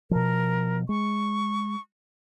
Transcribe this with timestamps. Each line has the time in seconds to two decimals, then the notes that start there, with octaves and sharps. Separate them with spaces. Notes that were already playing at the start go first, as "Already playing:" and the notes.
0.11 B2 F3 A#4
0.89 G#3 C#6